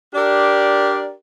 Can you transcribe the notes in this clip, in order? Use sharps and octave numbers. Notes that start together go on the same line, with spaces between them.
D4 G4 A#4 D5